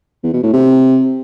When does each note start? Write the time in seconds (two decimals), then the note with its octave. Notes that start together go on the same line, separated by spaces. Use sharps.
0.23 E2
0.33 B2
0.43 A2
0.53 C3